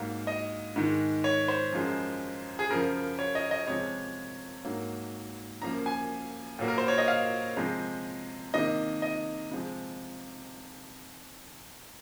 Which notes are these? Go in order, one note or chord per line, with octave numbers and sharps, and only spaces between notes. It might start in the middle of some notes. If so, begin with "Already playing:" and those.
Already playing: G#2 F#3 A#3 F5
D#5
G#2 D#3 G#3
C#5
C5
F#2 F3 G#3
G#4
F#2 C#3 F3 A#4
C#5
D#5
D#5
C3 F3 G#3 C#5
G#2 F#3 A#3
F#2 F3 A#3 A#5
G#5
A#2 F#3 A#3
A#4
C5
C#5
D#5
F5
C3 F3 G#3
C3 D#3 A#3 D#5
D#5
C3 F3 G#3